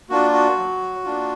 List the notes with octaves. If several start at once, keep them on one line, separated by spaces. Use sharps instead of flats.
A#3 D4 F4 F#4
F#4
F#3
A#3 D4 F4